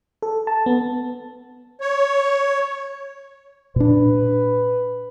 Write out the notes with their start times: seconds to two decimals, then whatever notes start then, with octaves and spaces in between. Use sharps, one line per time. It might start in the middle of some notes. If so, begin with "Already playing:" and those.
0.22 A4
0.47 A5
0.66 B3
1.81 C#5
3.76 A#2 D4 B4